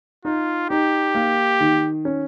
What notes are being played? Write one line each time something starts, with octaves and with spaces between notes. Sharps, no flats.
D#4 F4
D#4 G4
A#3
D#3
C#4